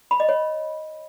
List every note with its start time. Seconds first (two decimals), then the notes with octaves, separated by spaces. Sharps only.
0.11 B5
0.20 D#5
0.29 C#5